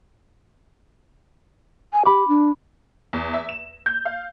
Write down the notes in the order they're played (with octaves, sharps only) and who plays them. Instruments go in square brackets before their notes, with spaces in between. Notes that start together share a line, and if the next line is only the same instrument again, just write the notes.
[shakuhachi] G#5
[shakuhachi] G4 [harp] B5 D6
[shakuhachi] D4
[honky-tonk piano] E2
E5
E7
G6
F5